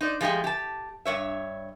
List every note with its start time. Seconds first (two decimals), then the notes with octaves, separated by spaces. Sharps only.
0.01 D#4 C5 D5
0.21 F3 G#3 A3 G4 G#4
0.44 G4 A5
1.05 G2 C#5 E5